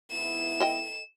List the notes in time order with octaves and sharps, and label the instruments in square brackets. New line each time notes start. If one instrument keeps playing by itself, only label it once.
[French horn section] G#2 B3 E4 [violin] E7
[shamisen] A4 D#5 G5